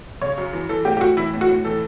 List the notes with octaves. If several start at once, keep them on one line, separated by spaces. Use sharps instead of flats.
C#3 C#5
F#2
E3
E3 A4
A2 G4
G4
A2 F#4
E3 E4
A2
F#4
A2
E3 A4